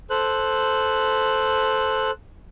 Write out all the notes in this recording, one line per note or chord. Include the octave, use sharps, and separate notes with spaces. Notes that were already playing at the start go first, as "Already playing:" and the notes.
A4 C5 F#6